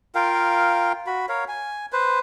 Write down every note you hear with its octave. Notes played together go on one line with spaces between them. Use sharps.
F4 A#4 F5 G5
F#4 B5
A#4 C#5 F5
G#5
B4 C5